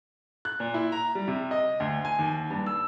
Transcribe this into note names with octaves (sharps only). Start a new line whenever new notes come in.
F#6
A#2
E4
A#5
G3
C3
D#5
D2
G#5
D#2
G2
E6